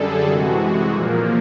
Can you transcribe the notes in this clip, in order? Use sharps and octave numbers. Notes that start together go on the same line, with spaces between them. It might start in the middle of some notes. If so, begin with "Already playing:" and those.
Already playing: F#2 D3 G3 G#4 A4
C3 E3 G#3 F#4
A#2 F3 A#3